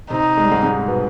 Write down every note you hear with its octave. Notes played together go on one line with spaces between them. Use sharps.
C3 C4 D#4
G#3
G3
G#2 G#3
G#2 G#3
B2 B3